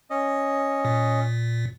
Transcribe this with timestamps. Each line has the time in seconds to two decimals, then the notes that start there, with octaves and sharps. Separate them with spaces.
0.10 C#4 D#5
0.85 A#2